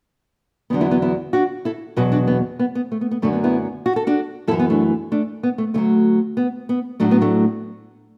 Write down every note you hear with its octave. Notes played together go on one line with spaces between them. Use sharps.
E2 D3 F#3 B3
B3 E4
B3 E4
B3 E4
D4 F#4
E4 A4
E2 B2 F#3 F#4 B4
D4 F#4
B3
B3
B3
A3
B3
B3
F#2 D3 F#3 A3
B3
B3 E4
F#4
A4
D4 F#4
F#2 E3 E4 A4
B3
A3 D4
A3 D4
B3
A3
D2 D3 F#3 A3
B3
B3
A2 F#3 A3 D4
B3
A3 D4